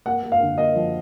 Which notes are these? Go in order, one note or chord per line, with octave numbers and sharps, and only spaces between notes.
A#3 F#5
A#3
F5
D3
A#3 D#5
F3